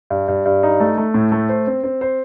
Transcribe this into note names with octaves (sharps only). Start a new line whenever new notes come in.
G2
G2
G2
D#4
A3
A3
A2
A3
C5
C4
C4
C5